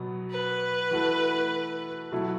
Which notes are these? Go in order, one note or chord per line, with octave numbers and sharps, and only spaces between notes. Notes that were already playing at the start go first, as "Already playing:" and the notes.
Already playing: B2 F#3 B3
B4
E3 A3 F#4 A4
B2 F#3 A3 E4 A4